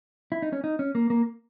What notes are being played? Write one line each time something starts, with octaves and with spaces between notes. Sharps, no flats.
E4
D#4
C#4
D#4
C#4
A#3
A#3